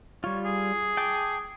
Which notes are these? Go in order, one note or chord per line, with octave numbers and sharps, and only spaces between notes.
G3 F4 C#5
G#4
G5 A5 D6